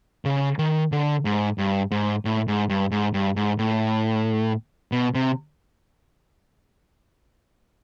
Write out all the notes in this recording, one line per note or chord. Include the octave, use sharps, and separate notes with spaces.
C#3
D#3
D3
G#2
G2
G#2
A2
G#2
G2
G#2
G2
G#2
A2
B2
C3